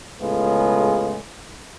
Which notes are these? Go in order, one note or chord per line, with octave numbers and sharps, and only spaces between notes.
A2 C#3 G#3 B3 F4